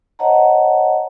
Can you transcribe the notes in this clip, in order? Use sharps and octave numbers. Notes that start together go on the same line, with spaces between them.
C5 C#5 D#5 F#5 A5 A#5